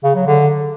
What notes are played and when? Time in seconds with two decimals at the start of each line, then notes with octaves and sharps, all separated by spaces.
0.04 C#3
0.16 F#3
0.27 D3